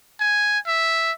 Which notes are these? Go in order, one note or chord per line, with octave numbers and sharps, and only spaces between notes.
G#5
E5